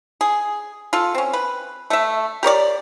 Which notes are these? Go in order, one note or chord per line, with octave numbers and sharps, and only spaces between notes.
G#4
F4 A4
C4 C#4
B4
A3 E5
G4 A#4 C#5 D5